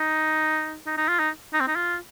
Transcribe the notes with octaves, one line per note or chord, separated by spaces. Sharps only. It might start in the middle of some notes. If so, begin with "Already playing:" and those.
Already playing: D#4
D#4
D#4
F4
D#4
D#4
C4
D#4
F4